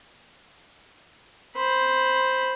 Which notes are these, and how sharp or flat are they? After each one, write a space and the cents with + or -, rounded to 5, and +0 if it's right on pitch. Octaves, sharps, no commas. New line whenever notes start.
C5 +0 B5 +0